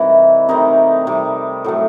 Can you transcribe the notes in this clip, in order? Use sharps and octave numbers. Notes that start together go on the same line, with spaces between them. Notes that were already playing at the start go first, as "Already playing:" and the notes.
Already playing: C3 D#3 E3 G3 E4
C3 D#3 E3 A3 D#4
C3 D#3 G3
A2 F#3 A3